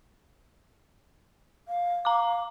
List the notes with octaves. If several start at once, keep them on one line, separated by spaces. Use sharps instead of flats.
F5
F5 A#5 D6